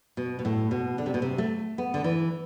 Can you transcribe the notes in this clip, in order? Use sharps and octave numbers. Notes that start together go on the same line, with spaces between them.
B2
B2
A2
B2
D3
C3
B2
C3
A3
B3
D3
E3